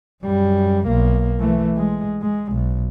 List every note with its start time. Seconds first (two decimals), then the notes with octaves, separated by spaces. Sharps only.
0.24 F#2 G3
0.88 B1 A#3
1.40 E3 A3
1.76 G#3
2.22 G#3
2.53 B1